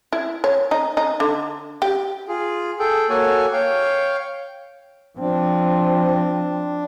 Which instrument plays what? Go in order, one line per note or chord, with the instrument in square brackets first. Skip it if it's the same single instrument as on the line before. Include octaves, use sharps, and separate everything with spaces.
[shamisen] E4
C#5
D#4
D#4
D3
G4
[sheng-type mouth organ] F4 G#4
G#4 A4 G5
A#3 F#4 A4 C#5 G#5
C#5 F5 G5
[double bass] F3 C4 [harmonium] D4